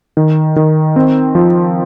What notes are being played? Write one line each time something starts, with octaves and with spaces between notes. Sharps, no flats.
D#3
D#3
C4
F3